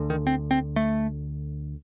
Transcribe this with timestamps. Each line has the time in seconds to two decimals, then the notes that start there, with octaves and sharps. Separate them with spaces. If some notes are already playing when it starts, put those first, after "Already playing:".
Already playing: D2 D3
0.10 D#3
0.27 C4
0.51 C4
0.76 A3